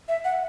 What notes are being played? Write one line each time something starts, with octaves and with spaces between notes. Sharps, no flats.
E5
F#5